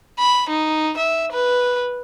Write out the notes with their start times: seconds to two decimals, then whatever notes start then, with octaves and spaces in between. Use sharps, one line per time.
0.19 B5
0.49 D#4
0.97 E5
1.32 B4